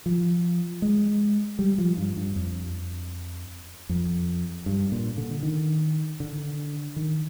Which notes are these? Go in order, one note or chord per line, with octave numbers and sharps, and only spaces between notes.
F3
G#3
G3
F3
G2
G2
F2
F2
G2
A#2
D3
D#3
D3
D#3